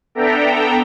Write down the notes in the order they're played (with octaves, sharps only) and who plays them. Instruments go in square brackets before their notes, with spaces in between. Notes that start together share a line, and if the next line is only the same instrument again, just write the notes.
[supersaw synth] B3 D4 A4 E5 G5 A#5